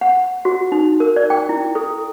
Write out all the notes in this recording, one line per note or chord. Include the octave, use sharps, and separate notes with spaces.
F#5
F#4
D#4
A#4
D5
G5
E4
A4